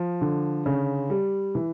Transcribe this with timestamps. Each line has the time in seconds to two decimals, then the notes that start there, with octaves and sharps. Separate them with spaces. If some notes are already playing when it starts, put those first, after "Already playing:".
Already playing: F3
0.21 D3
0.66 C#3
1.10 G3
1.55 E3